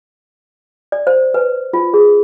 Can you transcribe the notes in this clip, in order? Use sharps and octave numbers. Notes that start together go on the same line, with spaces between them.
D5
C5
B4
F4
G#4